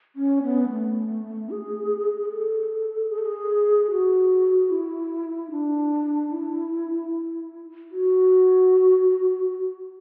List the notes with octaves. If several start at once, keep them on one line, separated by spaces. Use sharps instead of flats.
C#4
B3
A3
G#4
G#4
A4
G#4
A4
G#4
F#4
E4
D4
E4
F#4